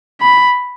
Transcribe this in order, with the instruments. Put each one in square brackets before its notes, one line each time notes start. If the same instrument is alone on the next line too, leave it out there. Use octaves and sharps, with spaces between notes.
[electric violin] B5